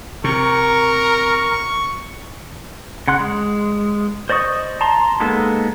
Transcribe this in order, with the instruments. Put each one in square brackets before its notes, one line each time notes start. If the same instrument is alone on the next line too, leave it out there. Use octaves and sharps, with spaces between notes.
[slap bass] C3 [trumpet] A#4 [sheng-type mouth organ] C#6
[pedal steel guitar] C#3 F#5 C6 F#6
G#3
C5 D5 D#5 C#6 D#6
A5 A#5 C6
G#3 A#3 B3 D#4 A4